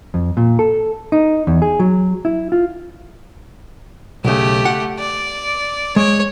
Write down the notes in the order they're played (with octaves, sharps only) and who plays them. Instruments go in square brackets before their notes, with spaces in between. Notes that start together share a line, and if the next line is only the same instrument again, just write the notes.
[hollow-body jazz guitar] F2
A#2
A4
D#4
E2
G#4
F#3
E4
F4
[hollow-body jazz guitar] B1 C#3 [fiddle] A3 G4
[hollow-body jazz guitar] F#5
[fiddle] D5
[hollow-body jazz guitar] G#3 [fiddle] C#5